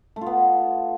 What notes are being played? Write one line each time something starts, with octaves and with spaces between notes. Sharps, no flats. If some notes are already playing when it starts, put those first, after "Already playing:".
A3
F4
B3